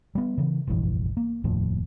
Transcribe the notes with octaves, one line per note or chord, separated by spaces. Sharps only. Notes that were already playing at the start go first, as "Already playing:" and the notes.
G3 B3
C#3 E3
F1 A#1 G2 E3
A#3
F1 D#2 A2 F3